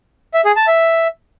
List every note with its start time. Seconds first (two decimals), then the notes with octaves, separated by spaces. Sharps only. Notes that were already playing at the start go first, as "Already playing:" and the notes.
0.34 E5
0.45 G#4
0.56 A5
0.67 E5